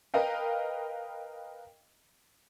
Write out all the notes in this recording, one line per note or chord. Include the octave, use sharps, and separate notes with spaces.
A#4 B4 D#5 F5 G5